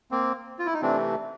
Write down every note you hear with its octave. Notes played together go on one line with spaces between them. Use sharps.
A#3 C4
F4
E4
D#4
C3 E3 A3 C4 D4